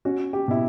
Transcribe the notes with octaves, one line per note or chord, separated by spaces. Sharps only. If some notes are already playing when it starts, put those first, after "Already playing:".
C#4 F#4
G4
B2 E4